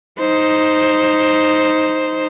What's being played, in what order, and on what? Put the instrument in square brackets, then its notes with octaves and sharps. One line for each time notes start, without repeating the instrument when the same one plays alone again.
[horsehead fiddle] D#4 C5